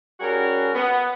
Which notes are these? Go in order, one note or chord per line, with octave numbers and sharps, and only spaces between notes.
G3 C#4 F#4 G#4 A#4
B3